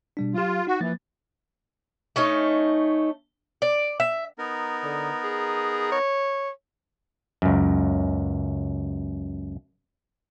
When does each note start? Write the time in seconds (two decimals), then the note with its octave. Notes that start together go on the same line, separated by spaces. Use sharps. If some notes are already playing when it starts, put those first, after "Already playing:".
0.17 B2 G3 D4
0.34 F#3 F4 G4
0.67 D#4 F#4
0.81 E3 F3 A#3 A6
2.16 A3 C#4 D#4
3.62 D5
4.00 E5
4.38 B3 D#4 A#4
4.83 D3
5.24 G#4
5.92 C#5
7.42 C#2 F#2